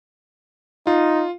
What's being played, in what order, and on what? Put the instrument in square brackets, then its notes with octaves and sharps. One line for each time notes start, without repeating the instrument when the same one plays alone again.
[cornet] D#4 [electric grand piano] F4